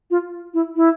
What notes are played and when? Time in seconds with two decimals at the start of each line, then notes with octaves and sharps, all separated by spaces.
0.11 F4
0.54 E4
0.76 E4